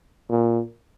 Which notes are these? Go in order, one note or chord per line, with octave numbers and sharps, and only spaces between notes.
A#2